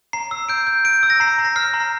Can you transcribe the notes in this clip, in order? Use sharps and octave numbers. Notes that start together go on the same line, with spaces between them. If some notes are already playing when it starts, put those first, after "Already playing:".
A#5 C7
E6
G6 D7
G6
G6 D7
E6
A#6
A#5 C7
A#5
A#6
F6 C7
A#5